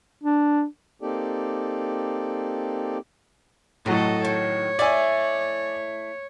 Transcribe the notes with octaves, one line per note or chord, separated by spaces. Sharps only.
D4
A#3 C4 D#4 G4 A4 D5
A2 C3 F#3 A4 D#5
D#3 C#5
A3 E4 D5 D#5 G#5